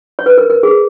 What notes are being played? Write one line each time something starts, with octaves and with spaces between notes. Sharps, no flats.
C#5
B4
A#4
A#4
G#4